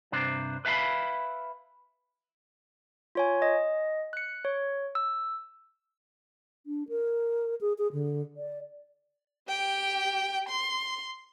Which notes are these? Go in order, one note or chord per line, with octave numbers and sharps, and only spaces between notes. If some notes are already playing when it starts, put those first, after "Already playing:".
G2 C3 D4 C5
B4 E5 F5 A5 B5
F4 C#5 G#5
D#5
F#6 C#7
C#5
E6
D4
A#4
G#4
G#4
D3
D5
G4 G5
C6